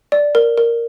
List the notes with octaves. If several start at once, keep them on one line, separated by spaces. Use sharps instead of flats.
D5
A#4
A#4